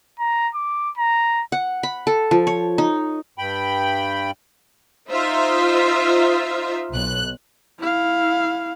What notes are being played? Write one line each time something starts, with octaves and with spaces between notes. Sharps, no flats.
A#5
D6
A#5
F#5
B5
A4
F3
C#5
D#4
G2 G5 B5
D#4 F4 C5 E5
B1 F#6
E4 F5